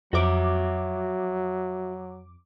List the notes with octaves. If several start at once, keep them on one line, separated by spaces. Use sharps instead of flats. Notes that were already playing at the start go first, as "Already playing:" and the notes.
F2 F#3 F#4 E5 D6